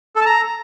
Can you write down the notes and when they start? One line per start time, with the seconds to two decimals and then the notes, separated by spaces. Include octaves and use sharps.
0.16 A4
0.21 A5
0.26 A#5